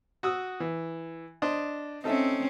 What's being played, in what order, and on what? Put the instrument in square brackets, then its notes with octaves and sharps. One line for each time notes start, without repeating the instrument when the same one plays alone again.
[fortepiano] F#4 D#6 E6
E3
D4 C5 D#5
[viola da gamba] C4 C#4 [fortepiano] D#4 A4 E5